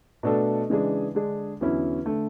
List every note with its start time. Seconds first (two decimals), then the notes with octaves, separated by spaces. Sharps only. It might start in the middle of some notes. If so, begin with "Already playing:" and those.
0.23 B2 A3 D4 F#4 A4
0.70 C#3 E3 G#3 D4 G#4
1.15 D3 G#3 D4 G#4
1.61 E2 D3 F#3 C#4 E4
2.06 D3 A3